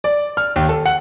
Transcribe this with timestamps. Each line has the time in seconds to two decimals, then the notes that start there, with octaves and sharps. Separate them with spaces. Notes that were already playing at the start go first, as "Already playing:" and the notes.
0.04 D5
0.37 F6
0.56 D#2
0.69 A4
0.86 F#5